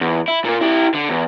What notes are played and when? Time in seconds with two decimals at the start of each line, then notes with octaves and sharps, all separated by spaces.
0.01 E2
0.28 E4
0.45 A#2 A#3
0.61 E4 G4
0.95 D3
1.09 E2